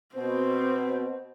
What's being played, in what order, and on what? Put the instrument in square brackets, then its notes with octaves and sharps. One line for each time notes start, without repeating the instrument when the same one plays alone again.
[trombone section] B2 [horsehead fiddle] C4 [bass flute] C5